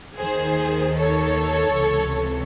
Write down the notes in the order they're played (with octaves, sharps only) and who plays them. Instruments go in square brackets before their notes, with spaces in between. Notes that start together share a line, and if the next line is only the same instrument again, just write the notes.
[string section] D#2 D#3 G#4 C5
A4 C#5
C#2 C3 E3